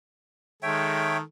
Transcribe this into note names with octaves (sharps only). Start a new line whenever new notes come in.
D#3 G#3 A4 C#5 E5 G5